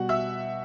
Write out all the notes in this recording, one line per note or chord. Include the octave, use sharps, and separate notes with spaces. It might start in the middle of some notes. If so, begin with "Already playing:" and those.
Already playing: B2 G3 F#4 F#5
E5 E6